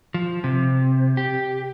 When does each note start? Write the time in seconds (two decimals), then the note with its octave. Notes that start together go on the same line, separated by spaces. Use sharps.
0.14 F3
0.44 C3
1.17 G4